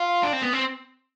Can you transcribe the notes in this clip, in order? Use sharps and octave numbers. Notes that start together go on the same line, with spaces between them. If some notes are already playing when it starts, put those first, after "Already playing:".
Already playing: F4
D4
C4
B3
C4